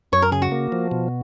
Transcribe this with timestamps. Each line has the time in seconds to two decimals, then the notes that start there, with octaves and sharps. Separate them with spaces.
0.12 F#2 C#5
0.22 A#4
0.32 C#3 G#4
0.42 F#4
0.52 A#3
0.72 F3
0.91 B2